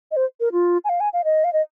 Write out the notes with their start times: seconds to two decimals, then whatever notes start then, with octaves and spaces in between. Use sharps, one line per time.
0.11 D#5
0.16 C5
0.40 A#4
0.53 F4
0.84 G#5
0.89 F5
1.00 G#5
1.13 F5
1.25 D#5
1.44 F5
1.53 D#5